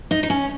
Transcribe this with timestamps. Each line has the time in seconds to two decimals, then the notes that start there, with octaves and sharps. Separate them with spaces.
0.11 D#4
0.23 D#4
0.30 C#4